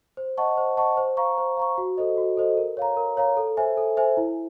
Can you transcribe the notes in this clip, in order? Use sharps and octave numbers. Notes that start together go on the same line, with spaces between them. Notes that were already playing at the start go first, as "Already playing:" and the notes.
C5
D#5 F#5 A5 C#6
C5
D#5 F#5 A5 C#6
C5
F5 A#5 C#6
C5
F5 A#5 C#6
F#4
A4 C5 D#5
F#4
A4 C5 D#5
A#4
C#5 F5 A#5
A#4
C#5 F5 A#5
A4
C5 E5 G#5
A4
C5 E5 G#5
E4